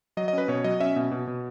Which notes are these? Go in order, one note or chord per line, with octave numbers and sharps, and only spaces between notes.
F#3 D#5
D#5
C#4 B4
B2 C#5
F#3 D#5
C#4 E5
B2
B2
B2